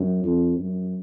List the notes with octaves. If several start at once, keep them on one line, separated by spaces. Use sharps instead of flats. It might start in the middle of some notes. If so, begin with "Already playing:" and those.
Already playing: F#2
F2
F#2